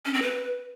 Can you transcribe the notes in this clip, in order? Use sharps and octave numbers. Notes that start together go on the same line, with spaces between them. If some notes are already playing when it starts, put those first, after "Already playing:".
C#4
C4
B4